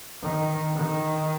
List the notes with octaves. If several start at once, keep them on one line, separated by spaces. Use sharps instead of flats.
D#3
D#3